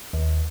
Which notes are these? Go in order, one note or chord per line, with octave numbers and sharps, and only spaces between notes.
D#2